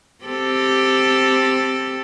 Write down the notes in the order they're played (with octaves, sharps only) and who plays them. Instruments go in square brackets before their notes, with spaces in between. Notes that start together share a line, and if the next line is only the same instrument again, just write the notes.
[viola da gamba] C4 G4 A4